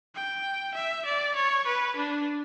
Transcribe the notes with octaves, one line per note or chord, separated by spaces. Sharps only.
G5
E5
D5
C#5
B4
D4